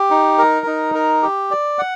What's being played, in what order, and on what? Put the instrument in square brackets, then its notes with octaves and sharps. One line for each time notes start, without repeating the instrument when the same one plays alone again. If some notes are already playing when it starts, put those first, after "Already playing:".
Already playing: [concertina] G4
D#4
A#4
D#4
A#4
G4
D5
F#5